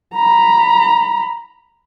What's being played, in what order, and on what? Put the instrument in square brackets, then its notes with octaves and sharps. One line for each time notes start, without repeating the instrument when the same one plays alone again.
[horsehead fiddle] A#5 B5